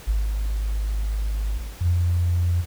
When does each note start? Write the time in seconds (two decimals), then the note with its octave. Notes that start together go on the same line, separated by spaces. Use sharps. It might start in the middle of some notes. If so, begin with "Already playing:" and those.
0.07 G#1
1.80 F2